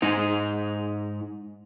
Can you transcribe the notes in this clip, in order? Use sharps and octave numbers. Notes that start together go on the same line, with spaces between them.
G#2 D#4 C5